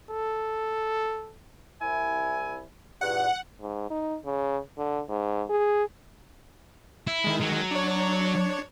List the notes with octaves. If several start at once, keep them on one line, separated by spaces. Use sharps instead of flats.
A4
C2 E4 G#5
E2 G2 A#2 F#5
G#2
D#4
C#3
D3
G#2
G#4
E4
D#3 G#3
F#3
D4 C#5